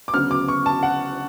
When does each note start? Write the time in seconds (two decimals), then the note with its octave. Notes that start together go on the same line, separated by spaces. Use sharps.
0.08 D6
0.14 D2 C#3 F#3 B3 F6
0.31 D6
0.48 C#6
0.66 A5
0.83 F#5